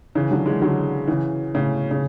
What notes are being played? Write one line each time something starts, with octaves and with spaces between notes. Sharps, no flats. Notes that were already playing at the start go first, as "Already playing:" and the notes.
C#3 E3
D3 F#3
E3 G#3
D3 F#3
C#3 E3
A2 C#3
C#3